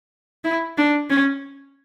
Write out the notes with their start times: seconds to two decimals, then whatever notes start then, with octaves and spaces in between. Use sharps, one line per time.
0.44 E4
0.77 D4
1.10 C#4